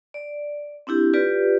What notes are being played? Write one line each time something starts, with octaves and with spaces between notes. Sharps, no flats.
D5
C4 D4 E4 G4
F4 G4 B4 D5